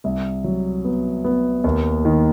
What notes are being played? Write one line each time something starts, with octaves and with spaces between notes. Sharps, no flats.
C2
F#3
B3
B3
D#2
D#3